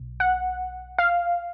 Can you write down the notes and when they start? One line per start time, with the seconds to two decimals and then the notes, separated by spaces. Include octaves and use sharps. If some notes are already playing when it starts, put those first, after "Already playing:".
Already playing: B1
0.20 F#5
0.98 F5